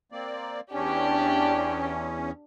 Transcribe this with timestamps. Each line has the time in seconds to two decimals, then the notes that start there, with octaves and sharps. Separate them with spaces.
0.12 A#3 C4 D5
0.72 E2 C#4 D4 G4